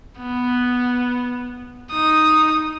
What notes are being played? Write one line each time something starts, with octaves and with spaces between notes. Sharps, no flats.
B3
D#4 D#6